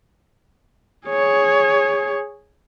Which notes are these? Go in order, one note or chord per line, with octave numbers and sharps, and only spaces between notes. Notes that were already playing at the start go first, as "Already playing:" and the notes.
G#4 C#5